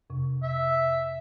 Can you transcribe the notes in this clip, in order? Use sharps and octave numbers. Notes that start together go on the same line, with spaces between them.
F2 C3
E5